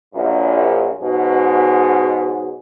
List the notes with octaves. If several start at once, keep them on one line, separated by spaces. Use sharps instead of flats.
A#1 F#2
G#2 B2 F#3 G#4